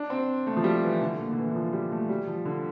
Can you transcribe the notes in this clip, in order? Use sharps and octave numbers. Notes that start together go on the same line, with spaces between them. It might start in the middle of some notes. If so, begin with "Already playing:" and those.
Already playing: D4
C4
A3
F3
G3
E3
D3
A#2
D3
E3
F3
G3
A3
G3
F3
D3